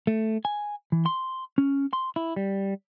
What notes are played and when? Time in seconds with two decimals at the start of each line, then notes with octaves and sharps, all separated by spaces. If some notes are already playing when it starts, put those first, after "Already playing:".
0.07 A3
0.45 G#5
0.92 E3
1.06 C6
1.58 C#4
1.93 C6
2.16 E4
2.36 G3